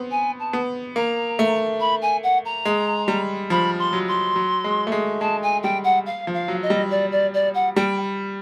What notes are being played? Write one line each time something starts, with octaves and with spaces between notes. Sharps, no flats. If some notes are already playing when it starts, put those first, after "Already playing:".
Already playing: B3 C4
G#5
A5
B3
A#3 A#5
A3
B5
G#5
F#5
A#5
G#3
G3
F3 B5
C6
F#3
C6
F#3
G#3
A3
G#3
G#3 A5
G#5
G3 G5
F#5
F5
F3
F5
F#3
D#5
G3
D5
D5
D5
F#5
G3 G5